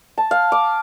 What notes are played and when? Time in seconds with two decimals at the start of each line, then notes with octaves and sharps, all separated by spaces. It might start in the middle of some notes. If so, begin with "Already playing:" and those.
0.18 A5
0.31 F5
0.52 D6